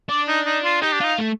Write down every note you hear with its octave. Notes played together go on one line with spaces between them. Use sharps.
D4 D5
D#4
D#4
F4
D#4 G4
D4
D#4 F4
A3